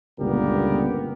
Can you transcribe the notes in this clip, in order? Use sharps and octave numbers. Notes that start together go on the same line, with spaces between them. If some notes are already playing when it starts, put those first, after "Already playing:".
G1 C#2 A#2 B3 G4 A#4